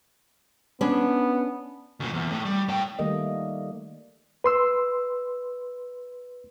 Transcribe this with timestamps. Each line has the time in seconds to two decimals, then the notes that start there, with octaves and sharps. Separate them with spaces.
0.81 B3 C#4 D4
2.00 D2 A#2
2.13 E2
2.32 A2
2.45 G3
2.68 A2 G5
2.99 D#3 G3 A3 A#3 D#5
4.44 B4 C6 E6